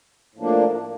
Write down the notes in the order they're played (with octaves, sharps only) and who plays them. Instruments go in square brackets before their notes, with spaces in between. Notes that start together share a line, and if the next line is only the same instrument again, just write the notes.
[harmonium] A2 F3 A#3 D4